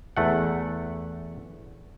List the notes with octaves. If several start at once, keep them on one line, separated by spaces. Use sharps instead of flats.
E2 A3 F#5